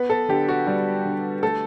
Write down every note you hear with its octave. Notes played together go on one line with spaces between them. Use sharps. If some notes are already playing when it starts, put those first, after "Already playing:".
Already playing: B3 B4
A4
D3 G4
F#4
G3
D3
A3 A4